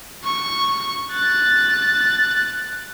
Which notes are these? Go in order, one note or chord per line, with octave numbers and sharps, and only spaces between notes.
C#6
F#6 A6